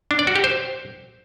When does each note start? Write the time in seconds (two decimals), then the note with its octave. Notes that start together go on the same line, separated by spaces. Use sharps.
0.11 D4
0.19 D5
0.27 F#4
0.36 G4
0.44 C5